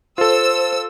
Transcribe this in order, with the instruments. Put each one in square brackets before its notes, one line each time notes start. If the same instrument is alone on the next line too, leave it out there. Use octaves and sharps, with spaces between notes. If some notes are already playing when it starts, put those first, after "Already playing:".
[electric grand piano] F4 A4 [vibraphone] C5 [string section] E6